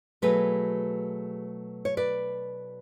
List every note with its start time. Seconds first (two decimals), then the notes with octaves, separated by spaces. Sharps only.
0.22 B2 F#3 A3 G#4 B4
1.85 C#5
1.97 B4 D5